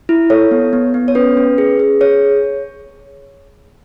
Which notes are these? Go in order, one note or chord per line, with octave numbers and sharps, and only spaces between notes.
E4
A4 C#5
B3
B3
B3
C#5
C#4 B4
C#4
G#4
G#4
G#4 C#5